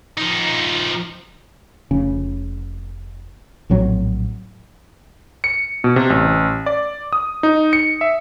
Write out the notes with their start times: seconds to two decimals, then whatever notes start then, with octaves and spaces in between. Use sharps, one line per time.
0.18 F3 D#4
1.91 F1 C#3 C#4
3.69 A#1 A2 F#3 C4
5.44 C#7
5.84 B2
5.96 C3
6.10 A1
6.66 D5
7.13 D#6
7.43 D#4
7.73 C#7
8.01 E5